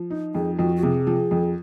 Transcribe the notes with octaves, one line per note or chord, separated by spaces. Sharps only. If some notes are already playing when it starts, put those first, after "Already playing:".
Already playing: F3
D#4
F2 G#4
F2 F#4
F#4
C3 G#4
F3
F2